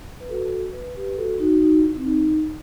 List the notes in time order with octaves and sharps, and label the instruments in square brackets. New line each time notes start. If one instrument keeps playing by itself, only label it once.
[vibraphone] B4
F#4 A4
B4
G4 B4
F#4 A4
D#4 F#4
D#4 F#4
E4
C4
D#4